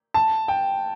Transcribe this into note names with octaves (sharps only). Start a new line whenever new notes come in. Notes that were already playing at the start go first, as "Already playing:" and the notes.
A5
G5